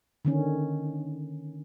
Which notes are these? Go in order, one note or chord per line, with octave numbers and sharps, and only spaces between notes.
D3 D#3 C#4